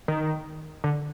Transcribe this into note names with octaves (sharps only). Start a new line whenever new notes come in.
D#3
D3